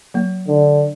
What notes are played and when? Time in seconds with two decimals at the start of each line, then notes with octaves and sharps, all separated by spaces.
0.14 F#3 A#3
0.47 D3